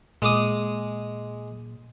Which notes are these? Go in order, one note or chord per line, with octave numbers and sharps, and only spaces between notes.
A#2 G#3 D6 D#6